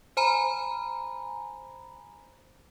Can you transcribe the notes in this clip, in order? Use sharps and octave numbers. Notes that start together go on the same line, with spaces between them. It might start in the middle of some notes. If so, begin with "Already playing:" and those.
C5 G#5 A#5 B5